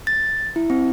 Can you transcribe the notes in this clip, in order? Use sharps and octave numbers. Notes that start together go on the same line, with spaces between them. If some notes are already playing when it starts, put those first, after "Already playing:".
A6
E4
C4